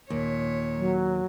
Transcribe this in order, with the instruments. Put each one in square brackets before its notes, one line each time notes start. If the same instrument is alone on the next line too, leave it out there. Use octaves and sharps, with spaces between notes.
[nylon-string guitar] D#2 [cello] A#2 C#5
[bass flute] F#3